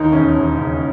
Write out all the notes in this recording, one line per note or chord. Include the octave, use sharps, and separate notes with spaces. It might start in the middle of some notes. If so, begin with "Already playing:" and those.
Already playing: D#2 D#4
E1 C#4
E1
C#3